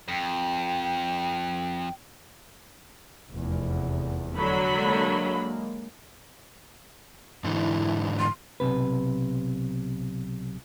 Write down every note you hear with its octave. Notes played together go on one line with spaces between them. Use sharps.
F2 G5
F1 E2
D3 F#3 B5
G#3 A#3
G#2 D3 E3 E4
C6
B1 C3 B4